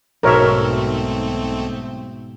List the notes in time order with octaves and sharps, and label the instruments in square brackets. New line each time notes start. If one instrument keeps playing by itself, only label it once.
[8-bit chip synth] B1 A3 C4 [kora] G#2 B2 [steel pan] A#4 C#5 E5